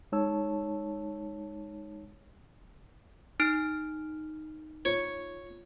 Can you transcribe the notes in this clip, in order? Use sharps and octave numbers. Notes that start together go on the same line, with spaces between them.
G#3 D#4 C#5 A5 E6
D#4 F6 D7
F4 C#5